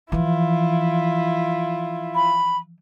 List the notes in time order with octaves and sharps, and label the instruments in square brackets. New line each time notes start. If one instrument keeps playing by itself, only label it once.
[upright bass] E3 F3 [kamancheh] E4 F4
[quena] B5